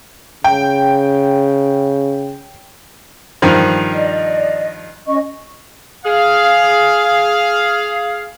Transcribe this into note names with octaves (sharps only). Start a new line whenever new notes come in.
C#3 G5
G2 D#3 F3
D5 D#5
C#4 D#5 C#6
G#4 F5